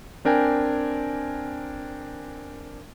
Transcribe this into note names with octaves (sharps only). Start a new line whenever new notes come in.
C4 D4 A#4 G5 G#5